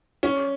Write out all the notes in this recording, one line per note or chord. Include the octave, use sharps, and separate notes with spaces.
C#4